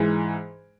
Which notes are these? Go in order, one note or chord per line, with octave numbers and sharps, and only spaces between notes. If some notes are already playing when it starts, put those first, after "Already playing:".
Already playing: G#2 E3 G#3